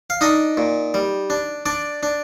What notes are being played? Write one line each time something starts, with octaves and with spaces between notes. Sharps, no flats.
F5
D4 D#4 D#5
A#2
G3
D4
D4 D5
D4